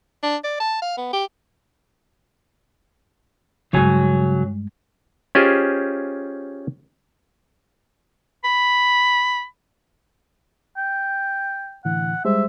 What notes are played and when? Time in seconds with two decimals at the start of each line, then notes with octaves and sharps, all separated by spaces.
0.23 D4
0.44 D5
0.60 A5
0.82 F5
0.97 B3
1.13 G4
3.73 G2 C#3 F#3 G#3 G#5
5.35 C#4 F4 G4 G#4 C5 D#5
8.44 B5
10.77 G5
11.85 A2 D3 E3 F#5
12.25 G3 G#3 C5 E5